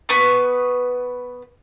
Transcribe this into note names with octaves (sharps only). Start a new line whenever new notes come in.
B3 B4 C#6